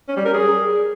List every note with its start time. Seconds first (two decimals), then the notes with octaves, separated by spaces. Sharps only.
0.08 C#4
0.17 G3
0.25 A#4
0.34 G#4